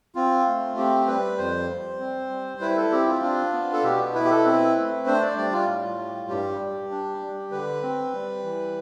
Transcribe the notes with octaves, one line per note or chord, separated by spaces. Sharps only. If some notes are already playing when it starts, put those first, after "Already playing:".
C4 F4
A3
C4 G4
G3 B4
F2 C5
G3
C4
G3
E4 B4
A4
C4 G4
F4
D4 F4
B3
A4
B2 G4
E4 B4
G4
A4
C4 B4
A3
D4 C5
D5
G3 D5
F4
A2
G3
G2 G4
G3
D4
G3
D3 B4
C4
G3
E3